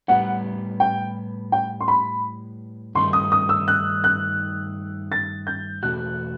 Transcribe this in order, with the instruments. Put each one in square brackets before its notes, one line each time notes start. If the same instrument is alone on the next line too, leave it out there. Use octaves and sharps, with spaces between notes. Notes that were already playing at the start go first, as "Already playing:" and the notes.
[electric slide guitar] A2 G3 B3 [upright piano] F#5
[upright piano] G5
G5
C6
B5
[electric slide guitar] G2 D#3 A3 D#4 [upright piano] C6
[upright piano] D#6
D#6
E6
F#6
F#6
A6
G6
[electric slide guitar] E2 B2 A3 F#4 [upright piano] F#6